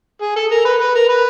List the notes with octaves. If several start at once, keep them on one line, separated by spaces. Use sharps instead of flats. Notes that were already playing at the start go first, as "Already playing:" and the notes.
G#4
A4
A#4
B4
B4
A#4
B4